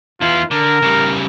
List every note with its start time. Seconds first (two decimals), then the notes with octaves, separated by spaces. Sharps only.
0.21 E2 E4 F4
0.51 D3 A#4
0.82 C#3 G3